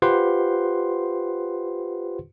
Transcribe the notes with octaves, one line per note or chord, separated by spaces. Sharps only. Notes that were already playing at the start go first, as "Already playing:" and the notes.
F4 G4 B4 C5 F#5 C6